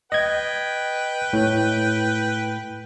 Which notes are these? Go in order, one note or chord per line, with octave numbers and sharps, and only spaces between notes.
B4 D#5 G5 G#6
A2